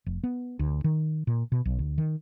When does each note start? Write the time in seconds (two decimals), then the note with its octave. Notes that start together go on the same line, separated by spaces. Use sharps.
0.06 F1
0.24 B3
0.59 D2
0.84 D#3
1.27 A#2
1.52 B2
1.65 B1
1.79 D2
1.98 D#3